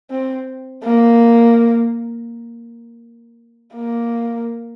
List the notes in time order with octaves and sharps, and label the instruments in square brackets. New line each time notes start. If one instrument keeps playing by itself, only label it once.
[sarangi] C4
A#3
A#3